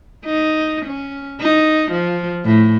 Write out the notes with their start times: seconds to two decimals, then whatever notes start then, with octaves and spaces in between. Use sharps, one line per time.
0.25 D#4
0.86 C#4
1.40 D#4
1.92 F3
2.45 A2